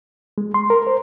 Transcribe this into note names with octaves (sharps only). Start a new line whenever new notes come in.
G#3
C6
A#4
C5